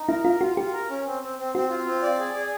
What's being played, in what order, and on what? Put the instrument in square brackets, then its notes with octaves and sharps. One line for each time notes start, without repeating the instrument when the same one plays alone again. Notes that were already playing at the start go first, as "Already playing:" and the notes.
Already playing: [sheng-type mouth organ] D#4
[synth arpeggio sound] E4 [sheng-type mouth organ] A#4
[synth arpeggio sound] F4 [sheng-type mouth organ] A#4
[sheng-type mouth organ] F4 [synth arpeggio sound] F#4
[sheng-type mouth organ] F4 [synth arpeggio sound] G4
[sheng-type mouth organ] A#4
C#4
C4
C4
C4
[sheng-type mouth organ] C4 [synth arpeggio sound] F#4
[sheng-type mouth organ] F4
C4
D5
G#4
G#4